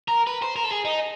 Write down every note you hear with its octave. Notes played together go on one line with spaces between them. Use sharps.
A#4
B4
C5
A#4
A4
G#4
D#4